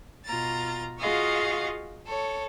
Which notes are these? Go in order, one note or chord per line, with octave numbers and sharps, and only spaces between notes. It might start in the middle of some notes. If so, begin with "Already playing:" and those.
B2 F4 A#5 A6
F4 F#4 G#4 D#5 F5 C#6
A4 C#5